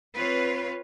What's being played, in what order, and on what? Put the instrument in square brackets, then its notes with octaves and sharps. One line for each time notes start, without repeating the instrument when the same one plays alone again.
[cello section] C4 F4 B4 C#5